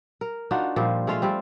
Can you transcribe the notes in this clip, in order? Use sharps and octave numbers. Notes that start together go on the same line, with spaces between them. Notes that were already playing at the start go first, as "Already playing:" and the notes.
A#4
D4 D#4 F4 F#4
A#2 F3 G3 C5
G#3 A3 F4 F5
G3 C4